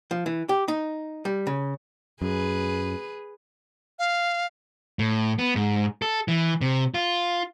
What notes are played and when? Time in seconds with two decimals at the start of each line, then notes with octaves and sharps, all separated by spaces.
0.11 F3
0.26 E3
0.49 G4
0.68 D#4
1.25 G3
1.47 C#3
2.22 F#2 G#4 B4
3.99 F5
4.99 A2
5.39 B3
5.56 G#2
6.02 A4
6.28 E3
6.61 C3
6.94 F4